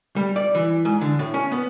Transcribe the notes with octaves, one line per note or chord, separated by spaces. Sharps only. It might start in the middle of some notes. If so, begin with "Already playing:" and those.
G3
D5
E3
G#2
D3
A2
C#4
B3